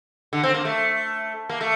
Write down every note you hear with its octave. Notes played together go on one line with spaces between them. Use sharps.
D3
C4
A#3
A3
A#3
A3